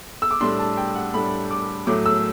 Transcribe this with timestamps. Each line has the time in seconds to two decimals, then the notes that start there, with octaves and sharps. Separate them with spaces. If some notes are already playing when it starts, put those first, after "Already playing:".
0.22 E6
0.31 D6
0.40 A2 G3 D4 C6
0.59 A5
0.77 G5
0.95 F#5
1.14 A2 G3 D4 B5
1.51 D6
1.87 A2 F#3 A3 D6
2.06 E6